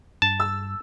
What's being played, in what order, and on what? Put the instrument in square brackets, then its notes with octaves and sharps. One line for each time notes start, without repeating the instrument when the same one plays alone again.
[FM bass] G2 [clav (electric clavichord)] A5
[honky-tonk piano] E6